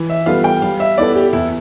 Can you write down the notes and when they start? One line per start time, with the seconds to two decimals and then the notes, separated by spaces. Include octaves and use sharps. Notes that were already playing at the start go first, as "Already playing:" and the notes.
Already playing: E3
0.10 E5
0.26 G3 B3 F4 A4 F5
0.44 G5
0.62 G3 F5
0.80 E5
0.98 B3 E4 A4 D5
1.16 G4
1.33 E2 E4